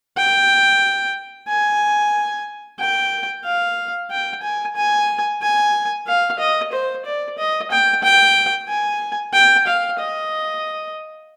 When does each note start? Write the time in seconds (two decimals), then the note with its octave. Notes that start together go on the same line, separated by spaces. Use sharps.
0.17 G5
1.48 G#5
2.80 G5
3.44 F5
4.11 G5
4.42 G#5
4.76 G#5
5.42 G#5
6.07 F5
6.39 D#5
6.72 C5
7.05 D5
7.38 D#5
7.71 G5
8.03 G5
8.68 G#5
9.34 G5
9.67 F5
9.99 D#5